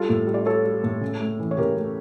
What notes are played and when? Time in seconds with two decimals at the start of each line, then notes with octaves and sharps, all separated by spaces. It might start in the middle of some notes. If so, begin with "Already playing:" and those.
Already playing: G3 F4 A4
0.09 A2
0.27 G3
0.34 D5
0.45 G3 A4 C#5
0.65 G3
0.84 A2
1.01 C#3
1.20 A3
1.39 E3
1.51 C#5
1.57 C#3 G4 A#4
1.77 A3